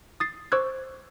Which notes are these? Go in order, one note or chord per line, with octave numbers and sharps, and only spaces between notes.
D#6 A6 C7
C5 C#6 D6 E6 F#6 G#6